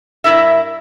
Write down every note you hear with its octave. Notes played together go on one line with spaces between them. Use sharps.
G2 G3 E4 A#4 E5